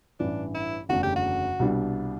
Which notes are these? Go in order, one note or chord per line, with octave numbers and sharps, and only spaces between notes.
A1 G2 E3 D4
E4
F#1 E2 D3 A3 D4 F#4
G4
F#4
C2 B2 G3 D4